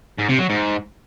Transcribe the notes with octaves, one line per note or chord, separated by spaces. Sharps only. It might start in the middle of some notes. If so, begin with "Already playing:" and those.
G#2
C3
F#3
G#2